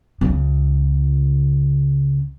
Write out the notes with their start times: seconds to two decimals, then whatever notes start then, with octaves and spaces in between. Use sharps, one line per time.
0.21 C#2 C#3